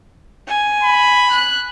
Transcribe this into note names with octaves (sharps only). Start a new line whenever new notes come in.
G#5
B5
F#6